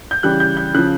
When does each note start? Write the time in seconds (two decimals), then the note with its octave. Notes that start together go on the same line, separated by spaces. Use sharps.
0.11 G6
0.23 C#3 E3 G3 F#6
0.40 G6
0.57 G6
0.74 C#3 F#6
0.78 F3